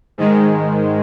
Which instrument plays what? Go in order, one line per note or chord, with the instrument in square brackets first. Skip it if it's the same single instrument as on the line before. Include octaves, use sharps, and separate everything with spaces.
[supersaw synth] G#2 D#3 G#3